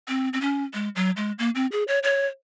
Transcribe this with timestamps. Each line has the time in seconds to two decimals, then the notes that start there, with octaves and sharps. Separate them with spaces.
0.08 C4
0.33 C4
0.41 C#4
0.74 G#3
0.96 F#3
1.17 G#3
1.39 A#3
1.55 C4
1.72 G#4
1.88 C#5
2.03 C#5